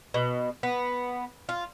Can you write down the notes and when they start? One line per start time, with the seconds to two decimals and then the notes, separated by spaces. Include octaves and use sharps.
0.14 B2
0.63 B3
1.49 F4